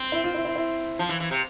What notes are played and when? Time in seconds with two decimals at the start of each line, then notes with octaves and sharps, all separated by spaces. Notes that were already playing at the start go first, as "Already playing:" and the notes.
Already playing: C4
0.12 E4
0.24 F4
0.34 E4
0.45 E4
0.55 E4
0.99 F3
1.09 E3
1.20 E3
1.31 C3